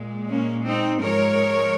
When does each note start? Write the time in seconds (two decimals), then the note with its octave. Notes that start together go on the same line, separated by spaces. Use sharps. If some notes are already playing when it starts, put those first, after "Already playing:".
Already playing: A#2 G#3
0.29 A#3 C#4
0.65 C4 D#4
1.01 G#2 F3 G#3 A#4 C#5